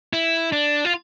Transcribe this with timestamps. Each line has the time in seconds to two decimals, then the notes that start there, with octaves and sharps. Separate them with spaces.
0.13 E4
0.52 D4
0.85 F4